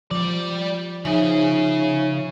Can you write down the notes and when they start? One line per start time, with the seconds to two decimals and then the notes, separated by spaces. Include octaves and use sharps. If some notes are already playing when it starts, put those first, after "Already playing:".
0.11 F3 G3 D5
1.05 C#3 F3 D#4 G#4 C#5 E5